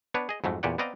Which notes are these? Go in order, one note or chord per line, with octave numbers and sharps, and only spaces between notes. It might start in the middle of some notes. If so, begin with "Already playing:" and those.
B3 D4 B4 C#5
G#4 D#5
F2 G#2 F#3 A3
E2 A#2 G4 C#5 D5 F#5
B3 C4 D5 D#5 F5 A#5